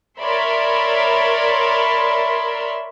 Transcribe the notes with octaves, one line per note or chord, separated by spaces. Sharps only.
A#4 C#5 D5 E5 B5 C6